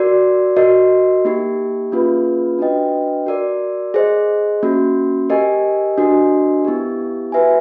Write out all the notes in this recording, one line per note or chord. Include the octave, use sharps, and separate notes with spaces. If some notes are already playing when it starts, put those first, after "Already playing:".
Already playing: F#4 A#4 D5
F#4 A#4 D#5
A#3 D#4 G4
A#3 C#4 F4 G#4 B4
D4 F#4 B4 D#5 G5
F#4 A#4 D5
G#4 C5 D#5
A#3 C#4 F#4
G4 A#4 D#5 G#5
D4 F#4 A#4 D#5 G#5
B3 E4 G4
F#4 B4 E5 G#5